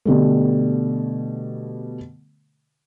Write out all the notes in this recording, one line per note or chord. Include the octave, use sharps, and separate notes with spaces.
B2 D3 G3 A3